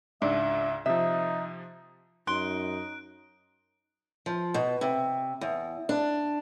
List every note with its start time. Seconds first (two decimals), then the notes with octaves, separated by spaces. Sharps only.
0.22 C#2 G#2 D4 E5
0.86 C3 F3 D#4 E5
2.27 F#2 D#4 C6 F#6 D7
4.26 F3
4.54 B2
4.81 C3
5.41 E2
5.89 D4